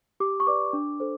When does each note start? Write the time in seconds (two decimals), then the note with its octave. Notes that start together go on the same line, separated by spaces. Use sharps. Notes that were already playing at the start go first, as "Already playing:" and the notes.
0.20 G4 D6
0.40 C#6
0.47 B4 D5 D6
0.73 D4
1.00 A4 C5